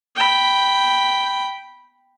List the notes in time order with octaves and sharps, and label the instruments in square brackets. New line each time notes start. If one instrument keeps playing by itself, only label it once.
[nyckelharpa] G5 B5